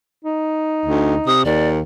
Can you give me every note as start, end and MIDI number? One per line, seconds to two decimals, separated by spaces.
0.25 1.33 63
0.85 1.16 38
1.27 1.41 48
1.27 1.42 87
1.45 1.81 39
1.45 1.69 74